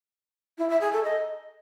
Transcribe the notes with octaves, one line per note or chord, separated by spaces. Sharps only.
E4
E5
G#4
A4
D#5